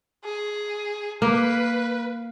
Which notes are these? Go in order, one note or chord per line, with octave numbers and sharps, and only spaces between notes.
G#4
A#3 B4